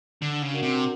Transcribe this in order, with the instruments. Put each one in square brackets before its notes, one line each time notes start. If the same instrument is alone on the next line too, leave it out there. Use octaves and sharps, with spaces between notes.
[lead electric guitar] D3 [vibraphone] D4
[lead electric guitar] C#3
[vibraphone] F#4 A#4 D5 F#5
[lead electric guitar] C3